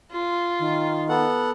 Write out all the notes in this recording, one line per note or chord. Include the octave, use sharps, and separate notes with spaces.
F4
D#3
B3 A4 F#5